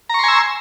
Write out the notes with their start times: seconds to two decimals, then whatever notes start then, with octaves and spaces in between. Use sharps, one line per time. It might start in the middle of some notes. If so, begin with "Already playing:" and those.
0.10 A#5
0.14 C#6
0.19 C6
0.24 G#5
0.28 E6